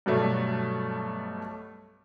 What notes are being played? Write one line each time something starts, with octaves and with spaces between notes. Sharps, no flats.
G2 B2 F#3 A3